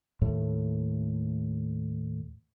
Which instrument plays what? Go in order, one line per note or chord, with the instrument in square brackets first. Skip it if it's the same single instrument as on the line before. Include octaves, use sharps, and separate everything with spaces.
[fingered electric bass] D#2 A2 A3